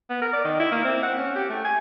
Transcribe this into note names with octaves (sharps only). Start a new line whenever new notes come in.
B3
A#4
D5
D#3
E4
A#3
C4
F#5
C#4
G4
A3
G#5